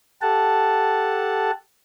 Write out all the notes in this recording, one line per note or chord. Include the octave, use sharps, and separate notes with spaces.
G4 A4 F#5 A5